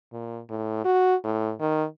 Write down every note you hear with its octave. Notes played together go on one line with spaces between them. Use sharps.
A#2
A2
F#4
A2
D#3